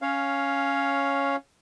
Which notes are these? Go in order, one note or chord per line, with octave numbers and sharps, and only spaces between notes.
C#4 C#5 F5